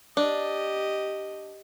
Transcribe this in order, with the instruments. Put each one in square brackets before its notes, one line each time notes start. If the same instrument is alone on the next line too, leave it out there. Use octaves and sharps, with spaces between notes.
[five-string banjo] D4 [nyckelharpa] G4 D#5